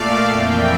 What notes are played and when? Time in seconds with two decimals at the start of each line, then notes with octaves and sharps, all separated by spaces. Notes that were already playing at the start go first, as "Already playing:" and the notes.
Already playing: A#2 A3 D5 F5
0.27 F2 E3 A#3 E5 G5